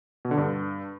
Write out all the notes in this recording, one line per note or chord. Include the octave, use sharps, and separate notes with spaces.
B2
D3
G2